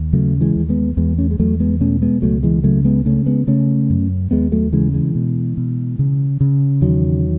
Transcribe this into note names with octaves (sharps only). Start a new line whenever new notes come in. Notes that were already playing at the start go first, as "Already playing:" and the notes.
Already playing: D#2
C#3 F#3 A3
E3 G#3
D#2
G#3 B3
E2 G#3 B3
A3 C#4
G#3
E2 F#3 A3
G#3 B3
B2 A3 C#4
G#3 B3
C#2 F#3 A3
E3 G#3
C#3 F#3 A3
G#3 B3
C#3 A3 C#4
G#3 B3
C#3 A3 C#4
F#2
D#2 G#3 B3
F#3 A3
C#3 E3 G#3
E3 G#3
B2
B2
C#3
C#3
E2 D#3 F#3